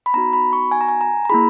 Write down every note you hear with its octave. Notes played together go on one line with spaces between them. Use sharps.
B5
B3 D#4 F#4 A#5
B5
C#6
G#5
A#5
G#5
A#5
A#5
A#3 E4 G#4 B5